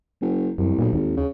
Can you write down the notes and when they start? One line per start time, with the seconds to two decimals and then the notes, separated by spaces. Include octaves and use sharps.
0.21 F#1
0.58 C2 F#2
0.79 B1 A#2
0.93 G#1 D#2
1.17 C#3